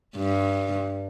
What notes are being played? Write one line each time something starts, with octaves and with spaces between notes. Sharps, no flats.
G2